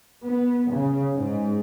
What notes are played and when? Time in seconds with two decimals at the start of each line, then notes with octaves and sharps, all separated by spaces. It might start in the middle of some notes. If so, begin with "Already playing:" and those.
0.25 B3
0.73 C#3
1.15 G#2